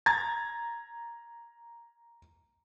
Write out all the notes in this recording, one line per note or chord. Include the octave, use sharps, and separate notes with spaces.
A#5 G#6 A6